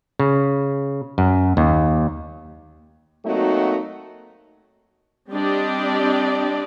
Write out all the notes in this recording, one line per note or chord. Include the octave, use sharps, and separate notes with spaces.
C#3
F#2
D#2
F#3 A3 A#3 C4 D#4 F#4
G3 C4 D4 G4 D5 D#5